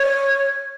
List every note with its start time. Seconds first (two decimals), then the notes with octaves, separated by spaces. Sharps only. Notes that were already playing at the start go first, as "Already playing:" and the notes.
Already playing: C#5